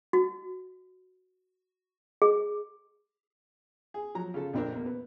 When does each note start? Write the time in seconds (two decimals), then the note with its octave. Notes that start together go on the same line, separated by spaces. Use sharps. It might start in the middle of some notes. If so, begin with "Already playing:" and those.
0.13 F#4
2.22 G#4
3.94 G#4
4.15 F3 F#3 A#5
4.34 C#3 F4 A4
4.53 A#1 F2 C4 D4 A#4
4.72 E2 A#3
4.86 B3